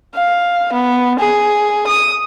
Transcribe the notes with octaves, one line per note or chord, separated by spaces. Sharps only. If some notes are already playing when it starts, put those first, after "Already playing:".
F5
B3
G#4
D#6